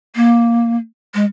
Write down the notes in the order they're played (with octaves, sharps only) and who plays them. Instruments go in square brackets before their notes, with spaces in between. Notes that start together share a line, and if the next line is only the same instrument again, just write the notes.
[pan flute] A#3
G#3